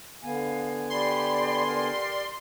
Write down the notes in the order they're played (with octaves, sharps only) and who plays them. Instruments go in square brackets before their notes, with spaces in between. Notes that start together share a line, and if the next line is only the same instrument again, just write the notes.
[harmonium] D3 B3 G#5 [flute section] F5
[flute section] G4 D5 B5 [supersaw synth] C6
[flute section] G4 A#4 D5